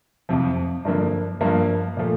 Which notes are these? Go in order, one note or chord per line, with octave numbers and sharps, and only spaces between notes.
F2 C3 F3
G2 D3 F3 A#3 D4
G2 F3 A#3
A#2 F3 A3